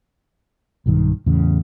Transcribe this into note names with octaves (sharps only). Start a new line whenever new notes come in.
B1 G2 D#3
E2 A2 C#3